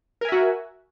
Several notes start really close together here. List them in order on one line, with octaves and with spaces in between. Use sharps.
A#4 G#5 E5 F#4